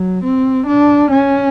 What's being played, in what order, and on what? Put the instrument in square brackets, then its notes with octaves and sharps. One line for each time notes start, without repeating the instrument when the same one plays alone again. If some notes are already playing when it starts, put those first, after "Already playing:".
Already playing: [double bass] F#3
C4
D4
C#4